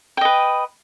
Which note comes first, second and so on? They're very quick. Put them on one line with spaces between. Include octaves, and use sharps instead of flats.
G5 D#5 B4